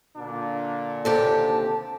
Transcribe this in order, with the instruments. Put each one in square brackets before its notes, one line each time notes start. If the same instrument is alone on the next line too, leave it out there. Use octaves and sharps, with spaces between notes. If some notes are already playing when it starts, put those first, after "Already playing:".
[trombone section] A#2 D3 D4
[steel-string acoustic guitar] D#2 C3 G4 [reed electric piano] A4 [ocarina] A5